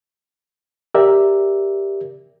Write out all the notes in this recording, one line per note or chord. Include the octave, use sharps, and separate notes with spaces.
G4 A#4 D5 E5